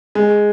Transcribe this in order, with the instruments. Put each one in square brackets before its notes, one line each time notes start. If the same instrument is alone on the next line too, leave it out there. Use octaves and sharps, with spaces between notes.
[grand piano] G#3